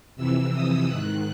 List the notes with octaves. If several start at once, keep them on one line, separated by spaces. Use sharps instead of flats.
F2 C3 E3 E6
D#6
G#2 D#3 F#6